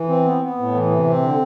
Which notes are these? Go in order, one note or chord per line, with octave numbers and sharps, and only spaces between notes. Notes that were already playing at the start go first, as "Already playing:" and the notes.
Already playing: E3
C4
B3
B3
A2
E3
C3
C4
D3